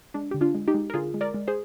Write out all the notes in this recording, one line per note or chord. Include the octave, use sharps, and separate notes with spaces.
G#3 D4
D3 G4
D4 F4
G#3
D#4 G4
G#3
A#4
D3 F4 G#4
G#3
A#4 D5
G#3
G#4 C5